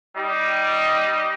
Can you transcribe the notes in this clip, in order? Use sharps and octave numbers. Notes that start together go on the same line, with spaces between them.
G3 D#4 G4 D#5 D6